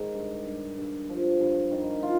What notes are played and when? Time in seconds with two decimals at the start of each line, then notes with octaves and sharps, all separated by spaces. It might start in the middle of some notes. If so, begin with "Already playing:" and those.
Already playing: G#2 D#3
0.15 G2
0.46 G2
0.78 G2
1.09 F3
1.41 G2
1.72 D#3
2.03 F4